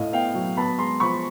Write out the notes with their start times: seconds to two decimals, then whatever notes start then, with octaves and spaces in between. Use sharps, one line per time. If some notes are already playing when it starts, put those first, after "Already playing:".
Already playing: A2 A3 D#5 F5
0.12 B3 F5 G5
0.34 F#3
0.57 B3 A5 B5
0.78 G#3 A#5 C6
1.00 F3 B5 C#6